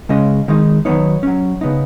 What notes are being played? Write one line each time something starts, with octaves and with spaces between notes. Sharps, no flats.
C#3 G#3 C#4 D#5
D#3 G#3 D#4
D#3 F#3 B3 D#4 C#5
F#3 C#4
C#3 B3 D#4